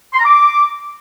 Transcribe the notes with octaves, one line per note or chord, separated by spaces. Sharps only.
C6
A#5
D6